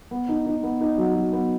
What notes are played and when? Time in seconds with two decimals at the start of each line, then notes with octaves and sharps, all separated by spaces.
0.11 B3
0.29 D#4
0.46 D#4
0.63 B3
0.81 D#4
0.98 F#3
1.15 F#3
1.33 B3